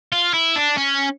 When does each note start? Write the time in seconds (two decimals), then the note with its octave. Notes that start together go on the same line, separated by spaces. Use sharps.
0.12 F4
0.34 E4
0.56 D4
0.77 C#4